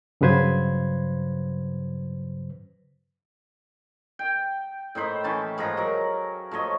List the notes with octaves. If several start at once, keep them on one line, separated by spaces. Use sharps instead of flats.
G2 C#3 F#3 B4 C5 G#6
G5
A2 D#4 C5 B5
E3 C#4 A5
G#2 F3 F#5 A#5
F#3 A#4
F3 A3 C#5 D#5